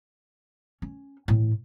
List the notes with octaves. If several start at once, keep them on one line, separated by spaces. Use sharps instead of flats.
C#4
A2 E3